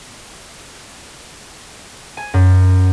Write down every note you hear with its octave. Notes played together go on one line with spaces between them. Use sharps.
G#5
F#2